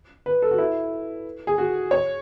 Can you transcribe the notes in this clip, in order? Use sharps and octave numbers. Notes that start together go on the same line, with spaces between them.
B4
A4
F#4
E4
G#4
F#4
C#5